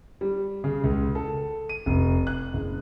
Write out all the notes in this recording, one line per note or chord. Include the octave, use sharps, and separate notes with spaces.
G3
C#3
C#2
A4
D#7
F1
F#6
F#1